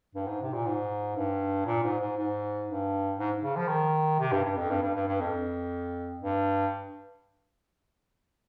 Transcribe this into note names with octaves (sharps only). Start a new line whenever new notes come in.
G2
G#2
C3
A#2
G#2
G2
A#2
G#2
G#2
G#2
G2
G#2
C#3
F3
D#3
C3
G2
G2
F2
G2
G2
G2
G2
F2
G2